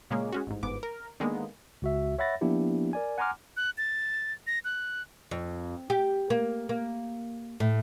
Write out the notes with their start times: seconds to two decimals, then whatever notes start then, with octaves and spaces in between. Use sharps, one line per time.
0.10 A#2 C#3 G#3 A#3 C#4 G#4
0.32 G#3 C#4 F#4
0.47 A1 G#2
0.63 G1 G#2 B3 D6
0.83 A#4
1.20 D3 D#3 G#3 A#3 B3
1.82 C#2 F#4 E5
2.18 C#5 E5 F#5 B5 A6 A#6
2.41 F3 A#3 B3 D4 E4 G4
2.93 A#4 D5 G#5
3.18 F#5 G#5 A#5 C6 D6 F6
3.57 F#6
3.78 A6
4.47 A#6
4.65 F#6
5.31 F2
5.90 G4
6.30 A#3
6.69 A#3
7.60 A2